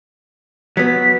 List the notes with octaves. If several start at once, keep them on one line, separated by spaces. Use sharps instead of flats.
F#3 B3 B6